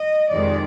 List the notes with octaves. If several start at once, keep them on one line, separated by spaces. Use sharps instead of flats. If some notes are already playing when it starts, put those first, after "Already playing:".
Already playing: D#5
F2 C3 D#3 G#3 D5